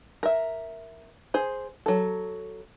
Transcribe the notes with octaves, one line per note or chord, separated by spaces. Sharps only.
A#4 E5
G#4 C5
F#3 A4